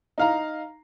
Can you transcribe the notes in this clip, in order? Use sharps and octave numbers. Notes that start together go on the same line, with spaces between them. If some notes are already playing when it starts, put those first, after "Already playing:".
D#4 F5 A#5